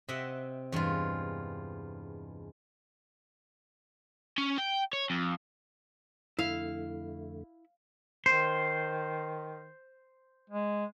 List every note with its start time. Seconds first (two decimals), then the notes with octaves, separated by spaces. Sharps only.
0.09 C3 D#5 E5 F#5 G5
0.72 E2 G2 G#3 F4
4.38 C#4
4.58 G5
4.93 C#5
5.10 F2
6.39 F2 D3 A3 E4 E5 F5
8.26 D#3 C5
10.50 G#3